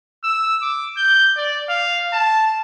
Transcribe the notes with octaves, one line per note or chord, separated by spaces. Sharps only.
E6
D6
G6
D5
F5
A5